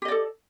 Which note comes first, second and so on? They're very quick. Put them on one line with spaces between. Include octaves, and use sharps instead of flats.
G4 D#5 D5 A4